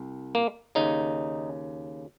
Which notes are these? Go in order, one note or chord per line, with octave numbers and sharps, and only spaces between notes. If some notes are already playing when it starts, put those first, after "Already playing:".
Already playing: C2
A#3
D#2 C#3 D#4